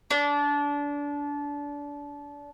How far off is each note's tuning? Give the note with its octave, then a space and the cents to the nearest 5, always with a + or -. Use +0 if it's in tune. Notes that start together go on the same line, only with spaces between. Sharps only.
D4 -25